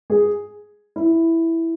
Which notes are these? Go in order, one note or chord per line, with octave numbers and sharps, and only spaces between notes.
G#4
E4